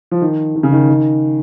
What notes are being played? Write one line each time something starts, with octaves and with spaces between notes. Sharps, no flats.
F3
D#3
D#3
C#3
D#3
D#3